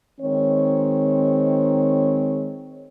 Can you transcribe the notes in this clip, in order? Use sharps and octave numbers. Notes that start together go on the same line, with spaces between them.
D#3 G#3 C4 C#5